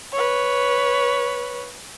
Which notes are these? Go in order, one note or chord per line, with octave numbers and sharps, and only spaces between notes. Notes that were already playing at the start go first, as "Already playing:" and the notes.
B4 C#5